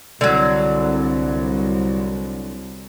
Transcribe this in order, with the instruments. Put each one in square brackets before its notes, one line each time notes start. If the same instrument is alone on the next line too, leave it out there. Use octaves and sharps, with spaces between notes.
[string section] C2 [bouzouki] D3 F#3